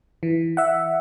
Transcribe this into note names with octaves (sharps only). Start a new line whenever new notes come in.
E3
E5 F#5